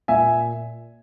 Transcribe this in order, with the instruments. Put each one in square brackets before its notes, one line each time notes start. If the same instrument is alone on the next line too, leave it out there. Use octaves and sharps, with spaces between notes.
[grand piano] A#2 E5 G#5